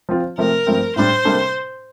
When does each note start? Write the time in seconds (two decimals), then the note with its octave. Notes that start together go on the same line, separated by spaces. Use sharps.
0.09 F3 C4 F4
0.38 C3 F3 A3 C4 A#4
0.67 G2 F3 A3 C4
0.96 A2 G3 D4 C5
1.25 C3 G3 A#3 D4 A4